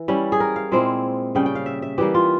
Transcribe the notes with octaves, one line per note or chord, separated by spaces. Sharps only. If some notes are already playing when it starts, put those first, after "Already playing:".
Already playing: E3
G3 C#4 E4
G#4
A#4
F5
A#2 G#3 C4 E4
C#3 G3 C#4 G5
G5
F5
E5
E5
E3 G3 A#3 G4
F4